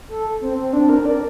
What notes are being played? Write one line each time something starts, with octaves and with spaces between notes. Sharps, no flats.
A4
C4
C4
D4
A#4
D5